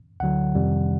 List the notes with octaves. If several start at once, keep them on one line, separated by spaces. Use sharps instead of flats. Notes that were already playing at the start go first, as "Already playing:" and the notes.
D2 D3 F#3 F#5
F2 C3 D#3 G3